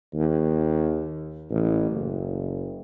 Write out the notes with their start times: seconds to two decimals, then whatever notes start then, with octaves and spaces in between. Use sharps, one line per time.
0.14 D#2
1.51 A1
1.91 F#1